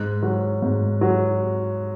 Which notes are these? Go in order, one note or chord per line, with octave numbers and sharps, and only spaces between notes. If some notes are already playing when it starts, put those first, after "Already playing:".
Already playing: G#2 F#6
F#3
G#2
F#3